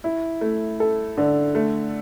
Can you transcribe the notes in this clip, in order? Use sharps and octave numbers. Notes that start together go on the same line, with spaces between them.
E4
A3
A4
D3
A3